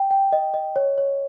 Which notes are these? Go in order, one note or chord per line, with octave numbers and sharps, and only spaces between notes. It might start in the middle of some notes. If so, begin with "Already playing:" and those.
Already playing: G5
G5
D#5
D#5
C#5
C#5